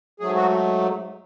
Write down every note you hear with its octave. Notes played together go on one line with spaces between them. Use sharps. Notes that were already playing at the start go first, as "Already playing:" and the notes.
G#2 F#3 A3 G#4
F#4